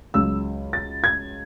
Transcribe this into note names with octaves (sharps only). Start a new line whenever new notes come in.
C#2 C#3 F#3 E6
A6
G#6